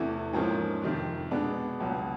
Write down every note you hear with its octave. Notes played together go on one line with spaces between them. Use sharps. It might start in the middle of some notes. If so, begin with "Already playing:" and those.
Already playing: E2 C3 E3 A3
G#2 F3 A#3 C#4
F2 C3 D#3
B2 G#3 B3 D4
C#2 B2 F#3